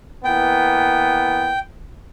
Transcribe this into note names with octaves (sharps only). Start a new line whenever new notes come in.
E3 A#3 B3 G5